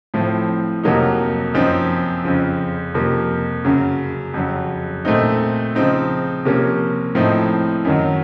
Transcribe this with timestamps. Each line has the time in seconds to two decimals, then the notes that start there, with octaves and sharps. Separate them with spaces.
0.14 A2 F3 C4
0.83 F2 C3 F#3 A#3 D#4
1.54 F#2 F3 C4 D#4
2.24 F2 C#3 F3 C4
2.94 F2 C3 F3 A#3
3.64 F#2 C#3 F#3
4.34 F2 C#3 F#3
5.05 A#2 A3 C4 D#4
5.75 C#3 F3 C4 D#4
6.45 C3 F3 A#3 C#4
7.15 A2 F3 C4 D#4
7.85 F#2 D#3 F#3